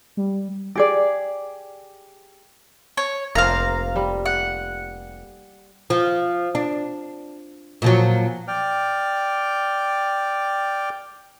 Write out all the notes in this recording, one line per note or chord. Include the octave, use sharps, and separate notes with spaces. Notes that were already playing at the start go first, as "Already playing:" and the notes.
G3
G4 G#4 D5
C#5
F1 A#3 F4 C5 F5 A#5
G3
F#5
F3
D4
A#2 F3 F#3
D5 G5 F6